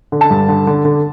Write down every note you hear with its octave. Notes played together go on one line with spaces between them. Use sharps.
D3
A5
G2
D3
D3
D3